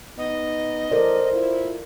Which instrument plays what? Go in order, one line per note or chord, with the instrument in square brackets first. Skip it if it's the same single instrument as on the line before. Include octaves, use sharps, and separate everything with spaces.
[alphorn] B3 [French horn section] D#4 [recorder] D#5
[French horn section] E3 [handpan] A4 A#4 D5 [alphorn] C5
[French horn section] E4 F4